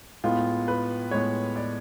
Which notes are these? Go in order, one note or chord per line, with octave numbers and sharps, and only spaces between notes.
A2 G#3 B3 F4
B4
A2 G#3 B3 C#5
D5